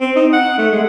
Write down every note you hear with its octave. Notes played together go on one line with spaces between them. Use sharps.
C4
D#4
F#5
A3
G#3